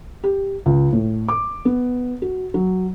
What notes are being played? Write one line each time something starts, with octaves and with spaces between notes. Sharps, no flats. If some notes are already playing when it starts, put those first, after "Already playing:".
G4
C#2
A2
D6
B3
F#4
F#3